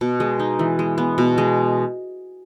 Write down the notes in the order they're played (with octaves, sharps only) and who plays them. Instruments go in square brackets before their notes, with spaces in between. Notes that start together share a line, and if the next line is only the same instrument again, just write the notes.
[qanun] B2
G#3
D#4
E3
G#3
B3
B2
G#3